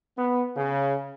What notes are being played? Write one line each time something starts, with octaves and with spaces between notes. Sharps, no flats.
B3
C#3